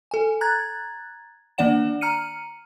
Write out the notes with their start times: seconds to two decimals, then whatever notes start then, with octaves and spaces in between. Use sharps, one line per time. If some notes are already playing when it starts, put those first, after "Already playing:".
0.11 A4 G#5
0.41 A#5 F#6 G#6 A6
1.58 D#3 A#3 D4 D5 F#5 E7
2.01 A#5 F6 C#7 D#7